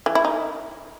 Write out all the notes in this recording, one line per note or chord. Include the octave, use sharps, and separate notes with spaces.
E3
E4
D#4